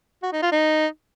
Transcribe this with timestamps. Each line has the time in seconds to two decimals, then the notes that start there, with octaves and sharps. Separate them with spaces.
0.23 F#4
0.33 D#4
0.42 F4
0.52 D#4